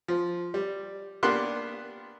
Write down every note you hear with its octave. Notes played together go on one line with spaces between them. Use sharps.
F3
G3
A#3 B3 D4 G4 C6 F#6